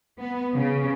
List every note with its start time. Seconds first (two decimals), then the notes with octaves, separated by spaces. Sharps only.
0.19 B3
0.55 C#3